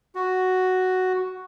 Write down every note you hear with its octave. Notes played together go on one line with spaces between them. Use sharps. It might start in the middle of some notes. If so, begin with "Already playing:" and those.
F#4